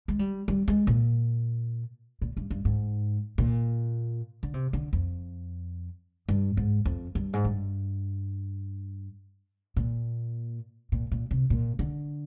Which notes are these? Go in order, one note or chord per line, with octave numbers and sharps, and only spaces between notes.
G#3
G3
G3
G#3
A#2
A#2
G2
G2
G#2
A#2
D3
C3
D3
F2
G2
G#2
F2
G2
G#2
G2
A#2
A#2
A#2
C3
A#2
D3